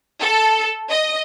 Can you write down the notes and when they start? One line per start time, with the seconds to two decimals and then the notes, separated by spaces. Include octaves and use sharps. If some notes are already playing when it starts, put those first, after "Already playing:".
0.21 A4
0.90 D#5